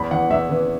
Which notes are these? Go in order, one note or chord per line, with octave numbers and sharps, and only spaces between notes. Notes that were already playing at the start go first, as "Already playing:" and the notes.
Already playing: E2 B5
E3 F#5
E2 E5
E3 B4